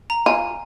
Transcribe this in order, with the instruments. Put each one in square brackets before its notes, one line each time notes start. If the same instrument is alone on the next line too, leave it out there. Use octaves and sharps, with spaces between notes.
[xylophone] A#5
[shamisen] F4 [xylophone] G#5